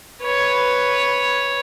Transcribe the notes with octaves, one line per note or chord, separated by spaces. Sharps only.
B4 C#5